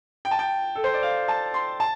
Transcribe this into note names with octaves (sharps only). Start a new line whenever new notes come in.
G5
A5
G5
A4
C5
D5
F5
A5
C6
A5